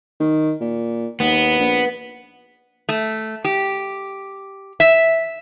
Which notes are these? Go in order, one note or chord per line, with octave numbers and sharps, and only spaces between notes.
D#3
A#2
D#2 B3
A#1
A3
G4
E5